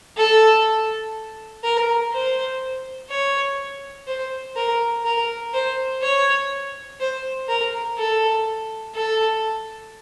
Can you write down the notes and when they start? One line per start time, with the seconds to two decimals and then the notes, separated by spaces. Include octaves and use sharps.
0.17 A4
1.64 A#4
2.12 C5
3.10 C#5
4.07 C5
4.56 A#4
5.05 A#4
5.54 C5
6.02 C#5
7.00 C5
7.48 A#4
7.98 A4
8.95 A4